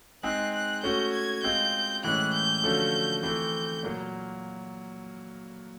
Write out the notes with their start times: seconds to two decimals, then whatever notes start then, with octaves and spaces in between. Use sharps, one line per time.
0.23 G#3 C4 D#4 G#4 F#6
0.54 F#6
0.83 A3 C#4 F#4 G6
1.13 G#6
1.43 G#3 C4 F4 G6
2.04 A2 E3 G#3 C#4 F#6
2.33 G6
2.64 D3 F3 A3 C#4 F#4
3.23 E3 A3 C4 G6
3.83 A#2 F#3 A#3